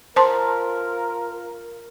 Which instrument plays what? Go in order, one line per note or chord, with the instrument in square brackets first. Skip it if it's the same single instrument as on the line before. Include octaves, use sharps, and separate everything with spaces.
[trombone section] F4 A#4 [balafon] C5 A5 C6